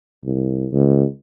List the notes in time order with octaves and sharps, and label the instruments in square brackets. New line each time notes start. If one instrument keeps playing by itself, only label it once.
[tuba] C2
C#2